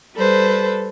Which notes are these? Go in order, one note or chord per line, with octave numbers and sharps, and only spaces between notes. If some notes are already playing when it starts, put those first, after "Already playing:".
G3 A4 B4 C5